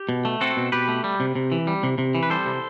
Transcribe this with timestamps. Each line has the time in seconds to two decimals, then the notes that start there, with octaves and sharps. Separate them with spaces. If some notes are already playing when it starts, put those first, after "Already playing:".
Already playing: G4
0.09 B2
0.25 A3
0.41 C4 F#4 A4
0.57 B2
0.72 B2 G4 B4
0.88 A3
1.04 G3
1.20 C3
1.35 C3
1.52 E3
1.67 G3
1.83 C3
1.98 C3
2.15 E3
2.23 B4
2.30 G3 A4 C5
2.46 C3